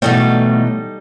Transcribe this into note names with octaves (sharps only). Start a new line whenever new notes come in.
B2 E3 F#3 G3 A3 D#4 A4